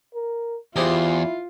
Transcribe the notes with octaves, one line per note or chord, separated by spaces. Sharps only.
A#4
E2 E4 F4 G4 G#4 C5